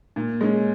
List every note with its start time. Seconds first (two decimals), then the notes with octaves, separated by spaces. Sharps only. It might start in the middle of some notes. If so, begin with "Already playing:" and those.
0.16 A#2
0.41 G#3 C#4